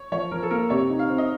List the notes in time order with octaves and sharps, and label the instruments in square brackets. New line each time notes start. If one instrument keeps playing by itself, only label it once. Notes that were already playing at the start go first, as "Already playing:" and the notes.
Already playing: [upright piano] C#5
[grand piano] F3 [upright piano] C#5
[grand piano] F3 [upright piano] A#4
[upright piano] A4
[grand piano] A#3 [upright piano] A#4
[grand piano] C3 [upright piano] C#5
[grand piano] D#4
[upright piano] F5
[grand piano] C4
[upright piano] D#5